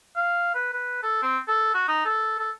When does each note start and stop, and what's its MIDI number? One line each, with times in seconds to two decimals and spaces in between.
0.16 0.51 77
0.54 0.69 71
0.74 1.02 71
1.03 1.19 69
1.22 1.38 60
1.48 1.71 69
1.74 1.85 66
1.88 2.02 63
2.05 2.34 69
2.38 2.50 69